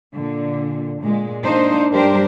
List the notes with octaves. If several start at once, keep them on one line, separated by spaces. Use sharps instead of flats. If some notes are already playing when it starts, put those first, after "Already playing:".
A#2 D3
A#2 G#3
A#3 D4 D#4 C5
G2 G3 D4 G4 A#4 C5